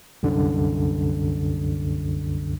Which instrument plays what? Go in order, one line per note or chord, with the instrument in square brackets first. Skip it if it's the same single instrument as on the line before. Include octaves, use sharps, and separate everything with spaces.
[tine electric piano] C2 F#2 D3